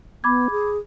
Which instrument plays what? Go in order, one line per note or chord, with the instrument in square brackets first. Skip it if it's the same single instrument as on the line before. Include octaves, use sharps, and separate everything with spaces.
[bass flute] B3 [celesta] B5 D6 G#6
[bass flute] G#4